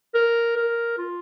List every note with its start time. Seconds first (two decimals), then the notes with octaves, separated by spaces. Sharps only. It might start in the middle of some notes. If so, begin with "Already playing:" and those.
0.14 A#4
0.56 A#4
0.98 F4